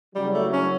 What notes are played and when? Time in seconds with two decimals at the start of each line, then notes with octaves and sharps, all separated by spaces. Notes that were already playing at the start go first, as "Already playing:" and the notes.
0.15 F#1 F#2 C#3 F#3 G3
0.34 A3
0.53 C#4